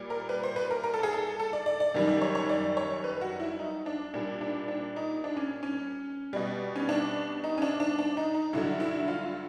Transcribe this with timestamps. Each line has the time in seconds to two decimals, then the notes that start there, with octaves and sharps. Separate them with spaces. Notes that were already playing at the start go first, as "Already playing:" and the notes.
Already playing: A#2 G3
0.10 A#4
0.29 B4
0.43 C5
0.56 B4
0.71 A#4
0.84 A#4
0.94 A4
1.03 G#4
1.13 A4
1.40 A4
1.53 D5
1.66 D5
1.80 D5
1.94 F#2 D#3 G3
2.08 D5
2.22 C#5
2.35 C#5
2.49 D5
2.77 C#5
3.04 B4
3.21 F#4
3.40 E4
3.59 D#4
3.86 D4
4.14 A#2 G3 D4
4.41 D4
4.68 D4
4.96 D#4
5.24 D4
5.37 C#4
5.63 C#4
6.33 B2 G3
6.76 C#4
6.89 D4
7.44 D#4
7.57 C#4
7.62 D4
7.80 D4
7.99 D4
8.17 D#4
8.34 D#4
8.53 G2 D3 F#3 E4
8.80 E4
9.08 F4